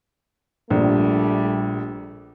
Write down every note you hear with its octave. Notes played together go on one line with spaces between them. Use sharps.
A#1 G3 A3